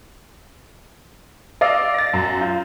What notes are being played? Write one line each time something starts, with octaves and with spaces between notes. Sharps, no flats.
D5 D#5 F5 D6 E6
A6 A#6
F#2
F4 G6